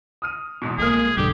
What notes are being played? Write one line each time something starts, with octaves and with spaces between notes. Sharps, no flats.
D#6 F6 D#7
E2 G#2 B2
C2 F2 G#3 A#3 G#4 F6
B1 G2 D3 G4